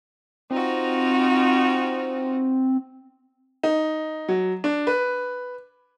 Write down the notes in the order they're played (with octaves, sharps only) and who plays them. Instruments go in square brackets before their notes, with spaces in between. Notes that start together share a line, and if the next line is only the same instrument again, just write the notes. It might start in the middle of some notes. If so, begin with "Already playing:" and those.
[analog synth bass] C4 [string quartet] D#4 F4 F#4
[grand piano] D#4
F#3
D4
B4